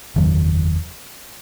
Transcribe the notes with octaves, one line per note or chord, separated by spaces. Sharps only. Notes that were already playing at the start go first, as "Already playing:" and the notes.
F#1 E2 D#3 F#3